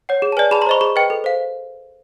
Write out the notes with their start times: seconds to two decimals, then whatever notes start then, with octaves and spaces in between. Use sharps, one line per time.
0.09 C#5 F#5
0.22 G#4
0.32 A5
0.37 B4 D5 G#5
0.51 G#4 A5 B5
0.62 A#5 C6
0.66 C5 D#5 B5 C#6
0.81 G#4 B5 C#6
0.96 B4 D#5 G5
1.10 A4
1.24 C5 F5